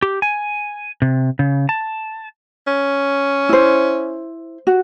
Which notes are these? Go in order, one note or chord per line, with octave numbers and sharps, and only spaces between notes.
G4
G#5
C3
C#3
A5
C#4
E4 C5
F#4